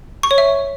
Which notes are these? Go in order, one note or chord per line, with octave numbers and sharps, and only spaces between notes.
C#6
C#5
E5